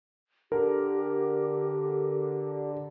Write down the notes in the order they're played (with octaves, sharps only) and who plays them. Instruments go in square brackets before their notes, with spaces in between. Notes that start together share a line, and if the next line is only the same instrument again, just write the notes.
[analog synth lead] D3 [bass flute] G4 [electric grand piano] A#4